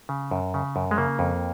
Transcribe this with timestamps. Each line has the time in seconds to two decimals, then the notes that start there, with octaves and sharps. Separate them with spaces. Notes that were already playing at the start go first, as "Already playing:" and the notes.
0.09 C#3
0.31 F#2
0.54 C#3
0.76 F#2
0.91 G#3
0.98 C#3 A#3
1.19 F2